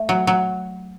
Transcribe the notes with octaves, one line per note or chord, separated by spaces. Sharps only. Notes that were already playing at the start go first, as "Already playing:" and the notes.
Already playing: A3
F#3
F#3